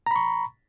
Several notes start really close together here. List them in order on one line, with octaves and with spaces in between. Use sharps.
A#5 B5 C#6